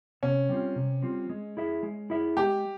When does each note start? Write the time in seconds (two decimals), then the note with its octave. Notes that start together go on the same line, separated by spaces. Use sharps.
0.23 C3 C#4
0.49 G3 C4 F4
0.76 C3
1.03 G3 C4 F4
1.29 G#3
1.57 E4 G#4 E5
1.83 G#3
2.10 E4 G#4 E5
2.37 G#3 G4